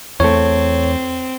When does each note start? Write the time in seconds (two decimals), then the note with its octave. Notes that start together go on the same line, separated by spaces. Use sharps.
0.20 E2 A3 C4 C#5